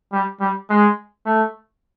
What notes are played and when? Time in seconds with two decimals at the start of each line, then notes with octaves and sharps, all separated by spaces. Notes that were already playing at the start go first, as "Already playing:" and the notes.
0.13 G3
0.41 G3
0.70 G#3
1.25 A3